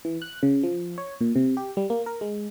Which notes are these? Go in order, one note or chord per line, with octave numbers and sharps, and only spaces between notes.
E3
F#6
C#3
F3
C#5
A#2
C3
G4
G3
A#3
A#4
G#3